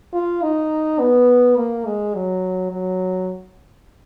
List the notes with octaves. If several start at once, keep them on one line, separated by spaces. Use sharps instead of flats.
F4
D#4
B3
A#3
G#3
F#3
F#3